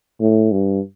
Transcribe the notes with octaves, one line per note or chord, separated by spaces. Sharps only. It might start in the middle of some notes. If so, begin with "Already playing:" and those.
A2
G2